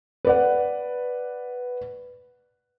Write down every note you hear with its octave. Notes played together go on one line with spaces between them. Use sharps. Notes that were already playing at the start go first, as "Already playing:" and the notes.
B4 D5 F#5